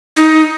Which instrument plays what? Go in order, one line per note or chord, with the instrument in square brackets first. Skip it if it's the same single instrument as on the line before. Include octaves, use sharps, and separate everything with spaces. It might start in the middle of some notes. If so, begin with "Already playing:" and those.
[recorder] D#4